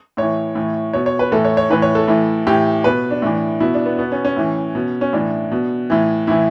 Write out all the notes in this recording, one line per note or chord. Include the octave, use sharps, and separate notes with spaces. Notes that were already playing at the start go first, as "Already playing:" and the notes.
A2 E3 C#5
A2 E3
B2 C#5
C#5
B4
A2 E3 A4
C#5
C#5
A2 E3 B4
C#5
A4
A2 E3
A2 E3 G4
B2 B4
D4
A2 E3
B2 E4
D4
B3
B2 B3
C#4
C#4
A2 E3
B2
C#4
A2 E3 D4
B2
A2 E3
A2 E3 E4